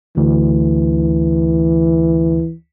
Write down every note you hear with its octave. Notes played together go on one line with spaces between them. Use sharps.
D2 E3